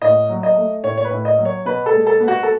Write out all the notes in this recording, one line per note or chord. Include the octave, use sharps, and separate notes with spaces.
A2 D#5
F#3
D#5
A3
A2 C#5
C#5
B4
A2
D#5
F#3
C#5
B2 B4
A4
G#3
A4
B3
F#4
A4